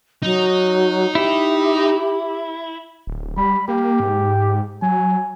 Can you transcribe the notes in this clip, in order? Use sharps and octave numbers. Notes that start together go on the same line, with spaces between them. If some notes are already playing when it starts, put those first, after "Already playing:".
F#3 D#4
E4 G4
D1
G3 B5
A#3 G4
G#2
F#3 G#5